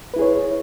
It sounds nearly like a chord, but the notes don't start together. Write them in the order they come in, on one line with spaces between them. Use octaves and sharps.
B4 E4 G#4 C#5